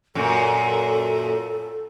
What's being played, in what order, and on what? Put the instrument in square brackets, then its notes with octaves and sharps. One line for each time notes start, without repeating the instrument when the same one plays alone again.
[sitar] F#2 A#2 [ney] A4